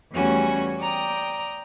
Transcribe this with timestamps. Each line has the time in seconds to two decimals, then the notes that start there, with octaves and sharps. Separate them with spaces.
0.12 E2 G3 A3 C#4 F#4 G#5
0.81 D5 G5 A#5 D#6